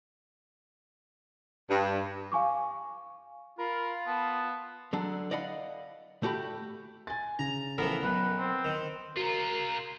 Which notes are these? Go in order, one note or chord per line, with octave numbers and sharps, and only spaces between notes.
G2
F5 G#5 C#6 D6
F4 A#4 B5
B3 A5
D3 F#3 D4
D5 D#5 F5 F#5 B5
A3 F#4 G4 B5
G#5 A6
C#3 A#5
A2 E3 F3 B3 A#4
B1 B4 F#6
C4
D#3
C#3 F4 F#4 A#4 A#5